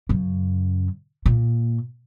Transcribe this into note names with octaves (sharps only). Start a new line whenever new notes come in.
F#2 C#3
A#2